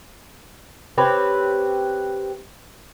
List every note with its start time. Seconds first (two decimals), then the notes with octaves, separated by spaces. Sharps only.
0.98 C4 G4 B4 C#5